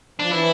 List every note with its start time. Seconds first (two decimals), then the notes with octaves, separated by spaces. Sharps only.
0.19 F3 D4
0.31 E3 E4